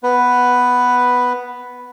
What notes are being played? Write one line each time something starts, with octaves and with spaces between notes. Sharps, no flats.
B3 B4